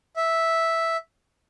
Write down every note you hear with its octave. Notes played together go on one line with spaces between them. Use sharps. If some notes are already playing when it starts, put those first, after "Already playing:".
E5